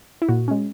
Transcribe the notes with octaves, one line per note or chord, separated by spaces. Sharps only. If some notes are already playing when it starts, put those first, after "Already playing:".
E4
A#2 F#4
G#3 C#4